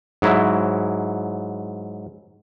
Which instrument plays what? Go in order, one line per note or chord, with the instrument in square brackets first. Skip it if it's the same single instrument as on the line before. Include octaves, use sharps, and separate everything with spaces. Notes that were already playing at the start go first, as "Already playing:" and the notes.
[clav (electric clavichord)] G#2 F#3 E4